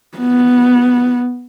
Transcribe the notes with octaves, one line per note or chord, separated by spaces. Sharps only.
B3